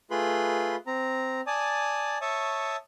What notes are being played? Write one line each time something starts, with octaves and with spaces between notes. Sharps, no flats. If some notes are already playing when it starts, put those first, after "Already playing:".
A3 F4 G#4 B4 B5 C6
C4 A#5
D5 G#5 A5 D#6
C#5 E5 A5 C#6 D#6